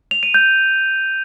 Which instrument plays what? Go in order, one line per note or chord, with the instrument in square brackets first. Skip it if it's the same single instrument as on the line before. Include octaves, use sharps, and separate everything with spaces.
[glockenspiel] F7
D#7
G6